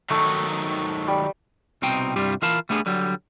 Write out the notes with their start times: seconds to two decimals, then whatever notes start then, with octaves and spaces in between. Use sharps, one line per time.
0.10 D#3 F#3 A3
1.08 G3
1.82 C2 B2 C4 D#4 G5
2.16 C2 G2 G3 F4 G4
2.42 E3 F4 A#4 F5 A5 B5
2.69 G3 A3 B3 D4 G#4
2.86 D3 F#3 G3